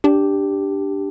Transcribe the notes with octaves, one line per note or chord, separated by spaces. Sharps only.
D4 G4